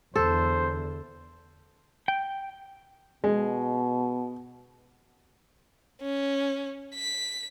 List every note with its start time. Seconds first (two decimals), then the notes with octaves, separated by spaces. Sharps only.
0.16 E2 D3 A4 C5
2.08 G5
3.24 B2 G#3
6.02 C#4
6.95 B6